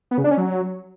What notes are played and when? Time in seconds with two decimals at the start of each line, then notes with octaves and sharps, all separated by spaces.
0.11 B3
0.18 C#3
0.24 D4
0.31 C#4
0.38 F#3